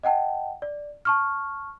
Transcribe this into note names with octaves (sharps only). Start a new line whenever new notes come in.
D#5 F#5 G5 A5
D5
A5 C#6 F6